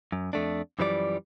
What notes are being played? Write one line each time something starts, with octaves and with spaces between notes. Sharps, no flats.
F#2
F2 A3 D4
F#2 E3 F3 G3 D5